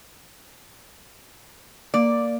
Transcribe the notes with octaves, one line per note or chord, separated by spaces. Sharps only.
A#3 D5